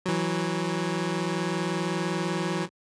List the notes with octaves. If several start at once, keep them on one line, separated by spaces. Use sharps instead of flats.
E3 F#3